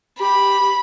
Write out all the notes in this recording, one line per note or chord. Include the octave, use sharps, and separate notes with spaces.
G4 B5